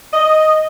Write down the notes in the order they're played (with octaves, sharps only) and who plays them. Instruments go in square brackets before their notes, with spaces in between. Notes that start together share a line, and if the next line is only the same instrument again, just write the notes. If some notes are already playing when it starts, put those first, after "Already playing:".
[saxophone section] D#5